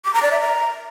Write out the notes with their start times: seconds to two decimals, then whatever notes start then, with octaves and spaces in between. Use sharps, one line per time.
0.05 D6
0.14 A#5
0.23 D5
0.31 E5
0.40 A#5